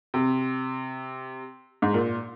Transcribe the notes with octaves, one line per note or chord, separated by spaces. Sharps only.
C3
G#2
A#2